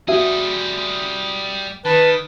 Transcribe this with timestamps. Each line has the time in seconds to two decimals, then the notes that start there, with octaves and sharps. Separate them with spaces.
0.08 G3 F#4 G#4 E5
1.85 D#3 B4 A5